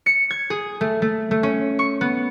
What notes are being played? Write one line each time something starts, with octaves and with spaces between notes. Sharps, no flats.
C#7
G#6
G#4
A3
A3
A3
C#4
C#6
B3